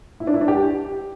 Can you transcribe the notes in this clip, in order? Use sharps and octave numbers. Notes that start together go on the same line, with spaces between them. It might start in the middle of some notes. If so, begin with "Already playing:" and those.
E4
D4
E4
D4
G4